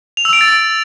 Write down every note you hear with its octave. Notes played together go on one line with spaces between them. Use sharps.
F7
E6
D7
A6